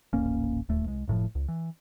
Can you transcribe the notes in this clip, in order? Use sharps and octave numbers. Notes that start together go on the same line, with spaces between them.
D#1 A1 A#3 C#4
D1 D#2 A3
C2 G#3
F#1 A2 D3 F3
C#2
E3